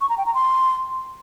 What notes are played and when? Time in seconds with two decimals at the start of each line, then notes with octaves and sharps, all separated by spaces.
0.01 C#6
0.09 A#5
0.18 G5
0.26 A#5
0.35 C6